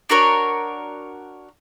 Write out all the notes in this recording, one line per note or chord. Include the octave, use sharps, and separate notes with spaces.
D4 F#4 A#4 C#5